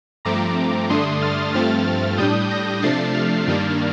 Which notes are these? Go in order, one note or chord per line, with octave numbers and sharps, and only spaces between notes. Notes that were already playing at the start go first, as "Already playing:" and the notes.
G2 F3 A3 C4 A#5 D6
G2 D3 A3 D4 C6 D#6
F6 A6
G2 F3 A3 C4 F6 A6
A2 G3 D4 D#6 G6
G6 A#6
C3 F3 A3 D4 A6 C7
F6 A6
G2 D#3 G3 A#3 D4